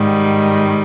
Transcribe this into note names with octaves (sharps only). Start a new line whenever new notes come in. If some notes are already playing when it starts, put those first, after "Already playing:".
Already playing: G#2 D#3 G3